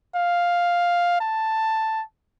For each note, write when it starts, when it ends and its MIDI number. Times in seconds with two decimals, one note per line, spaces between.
0.15 1.17 77
1.20 2.02 81